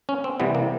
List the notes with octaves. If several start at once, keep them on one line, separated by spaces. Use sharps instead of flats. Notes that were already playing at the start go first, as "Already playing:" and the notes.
C#4
C4
C3 E3 G3 B3
A#3